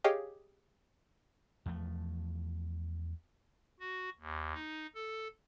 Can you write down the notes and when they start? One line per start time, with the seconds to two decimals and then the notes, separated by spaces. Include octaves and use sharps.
0.04 G4 G#4 C#5 D#5 F5 G5
1.66 E2 F3 A3
3.80 F#4
4.20 D#2
4.54 D#4
4.95 A4